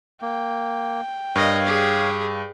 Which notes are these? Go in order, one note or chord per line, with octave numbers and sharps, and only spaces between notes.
A#3 G5
G2 A#4 C#5 D#5 F5
G4 G#4